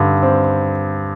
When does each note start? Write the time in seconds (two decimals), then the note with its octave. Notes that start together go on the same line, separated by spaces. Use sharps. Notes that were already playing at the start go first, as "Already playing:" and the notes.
Already playing: G2 D3 G3
0.23 C4